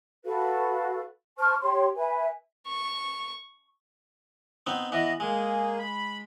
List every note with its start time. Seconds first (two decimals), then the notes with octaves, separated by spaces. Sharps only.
0.25 F#4 A4 B4 F5
1.38 C5 A5 C#6 F6
1.61 G4 C#5 C6
1.96 B4 E5 G#5
2.68 C#6
4.67 B3 C4 D#4
4.92 E3 B3 D#5
5.20 G#3 A#3 G#4
5.79 B5